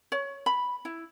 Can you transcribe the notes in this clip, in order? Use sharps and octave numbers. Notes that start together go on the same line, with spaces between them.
C#5
B5
E4